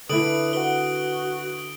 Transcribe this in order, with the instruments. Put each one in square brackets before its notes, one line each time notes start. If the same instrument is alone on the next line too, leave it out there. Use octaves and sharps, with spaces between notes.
[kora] D3 E4 [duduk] B4 [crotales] D#6 D7 F#7
[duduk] F#4 [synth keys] B4 F#5 [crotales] G7